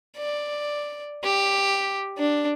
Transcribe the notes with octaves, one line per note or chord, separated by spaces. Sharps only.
D5
G4
D4